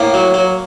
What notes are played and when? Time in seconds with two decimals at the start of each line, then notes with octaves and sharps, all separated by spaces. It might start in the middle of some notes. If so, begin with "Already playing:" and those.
Already playing: A2 A#3
0.14 F#3
0.34 F#3